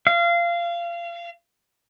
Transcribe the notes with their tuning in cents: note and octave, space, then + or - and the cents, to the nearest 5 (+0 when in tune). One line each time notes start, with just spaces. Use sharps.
F5 -25